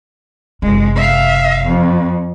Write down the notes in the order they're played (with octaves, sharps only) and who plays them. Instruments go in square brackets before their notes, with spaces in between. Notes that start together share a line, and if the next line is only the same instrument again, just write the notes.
[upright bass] F#1 C3 [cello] G#3
[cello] E5 F5
F2